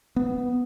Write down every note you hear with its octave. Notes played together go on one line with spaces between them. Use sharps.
B3